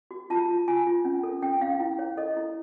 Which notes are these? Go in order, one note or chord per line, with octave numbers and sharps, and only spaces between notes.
F#4
F4 A5
F4
F4 G#5
F4
C#4
A4
C#4 G5
C#4 F5
E4
C#5
A4 D#5
E4